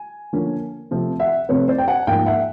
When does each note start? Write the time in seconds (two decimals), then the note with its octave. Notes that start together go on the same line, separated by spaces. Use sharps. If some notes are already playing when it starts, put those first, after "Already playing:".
Already playing: G#5
0.33 D3 F3 A#3 C#4
0.91 C3 F3 A3 C4
1.20 E5 F#5
1.49 C3 F3 A3 C4 B4 C#5
1.68 C5 D5
1.78 G5
1.88 F#5 G#5
2.07 G#2 F3 A#3 F5 G5
2.26 E5 F#5